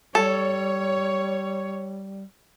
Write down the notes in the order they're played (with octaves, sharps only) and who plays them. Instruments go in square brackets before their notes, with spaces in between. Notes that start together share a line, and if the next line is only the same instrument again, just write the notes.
[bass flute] G3 [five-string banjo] A4 [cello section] C#5